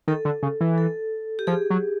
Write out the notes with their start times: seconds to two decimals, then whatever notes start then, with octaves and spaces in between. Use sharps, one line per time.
0.08 D#3 A4
0.25 D3
0.43 C#3
0.61 E3
0.78 A4
1.39 G4
1.47 F3 G#4
1.70 F#3